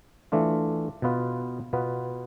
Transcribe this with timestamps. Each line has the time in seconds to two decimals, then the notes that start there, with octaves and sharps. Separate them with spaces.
0.32 E3 A3 D4 F4
1.02 B2 B3 F4 B4
1.73 B2 B3 F4 B4